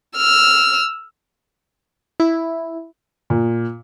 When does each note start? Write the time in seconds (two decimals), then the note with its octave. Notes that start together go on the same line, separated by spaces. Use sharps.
0.17 E6 F6
2.20 E4
3.30 A#2